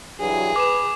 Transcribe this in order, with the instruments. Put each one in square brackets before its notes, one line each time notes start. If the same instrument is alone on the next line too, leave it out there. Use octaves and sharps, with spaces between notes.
[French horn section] G2 E3 F#3 [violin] G#4
[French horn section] B4 [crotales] D6 E7